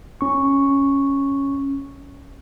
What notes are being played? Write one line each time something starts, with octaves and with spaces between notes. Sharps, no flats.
C#4 C#6